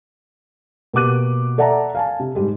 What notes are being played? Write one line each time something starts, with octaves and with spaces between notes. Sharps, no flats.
B2 A#3 G4 D6 F#6 D#7
A4 D5 E5 F#5 A5 A#5
F5 G#5 A5
C3
G#2 G3 G#3